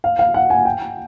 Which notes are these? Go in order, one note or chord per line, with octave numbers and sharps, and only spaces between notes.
F5
F5
F#5
G#5
G5